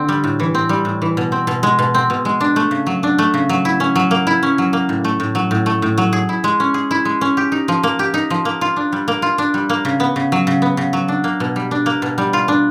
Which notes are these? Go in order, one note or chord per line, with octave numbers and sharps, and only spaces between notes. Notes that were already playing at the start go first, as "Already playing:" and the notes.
Already playing: D3 C4
G3
A2
E3
C4
G3
A2
E3
B2
C4
B2
G#3
B2
C4
B2
G#3
D4
A3
C#3
F#3
D4
A3
C#3
F#3
E4
C#4
F#3
A#3
E4
C#4
F#3
A#3
A2
A3
A2
F#3
A2
A3
A2
F#3
G#4
E4
G#3
C#4
G#4
E4
G#3
C#4
G4
D#4
F3
A#3
G4
D#4
F3
A#3
F4
D4
G3
A#3
F4
D4
G3
A#3
C#3
B3
C#3
F#3
C#3
B3
C#3
F#3
D4
A#3
B2
G3
D4
A#3
B2
G3
F4
D4